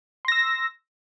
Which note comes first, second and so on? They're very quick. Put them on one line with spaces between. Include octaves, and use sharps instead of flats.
C6 A#6 E6